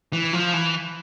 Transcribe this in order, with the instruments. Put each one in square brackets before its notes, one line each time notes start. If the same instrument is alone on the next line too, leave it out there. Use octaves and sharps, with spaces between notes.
[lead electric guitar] E3
F3
E3